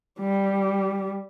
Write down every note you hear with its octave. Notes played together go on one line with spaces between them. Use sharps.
G3